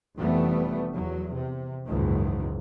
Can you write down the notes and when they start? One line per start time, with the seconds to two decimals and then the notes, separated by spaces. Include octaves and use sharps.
0.17 F1 F2 E3 G3 A3 B3
0.95 E2 F#3
1.33 C3
1.86 F#1 C#2 G#2 D#3 E3